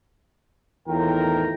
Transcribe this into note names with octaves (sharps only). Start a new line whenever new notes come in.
E2 A2 D#3 F4 A#4 G5